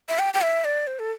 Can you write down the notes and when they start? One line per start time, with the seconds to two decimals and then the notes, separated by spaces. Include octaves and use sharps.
0.09 E5
0.19 G5
0.34 G5
0.42 E5
0.65 D5
0.87 C5
0.99 A4